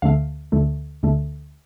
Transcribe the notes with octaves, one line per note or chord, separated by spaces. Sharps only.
D2 D3 A3 F5
D2 D3 A3
D2 D3 A3